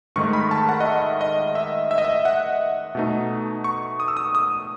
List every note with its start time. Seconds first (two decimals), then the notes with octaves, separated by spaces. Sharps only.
0.16 G#2 D#3 A3 D#4 C#6
0.33 B5
0.51 A5
0.69 F#5
0.80 D#5
0.85 E5
1.21 D#5
1.55 E5
1.91 E5
1.98 D#5
2.05 E5
2.25 F#5
2.95 B2 A3 D#4
3.64 C#6
4.00 D#6
4.08 E6
4.17 D#6
4.35 D#6